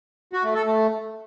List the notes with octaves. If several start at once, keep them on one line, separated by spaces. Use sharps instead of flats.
F#4
A3
A4
A3